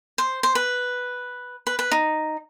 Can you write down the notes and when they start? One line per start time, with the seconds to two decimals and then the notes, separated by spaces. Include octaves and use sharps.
0.18 C5
0.43 C5
0.55 B4
1.67 B4
1.79 B4
1.91 D#4